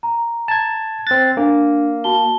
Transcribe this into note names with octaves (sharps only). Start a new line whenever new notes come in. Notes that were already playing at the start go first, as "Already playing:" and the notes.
A#5
A5 G#6
C4 F#6 A6
A#3 D4
F#4 A5 G7